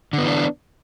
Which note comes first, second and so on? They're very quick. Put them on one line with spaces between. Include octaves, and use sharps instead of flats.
D3 B3 E3 D4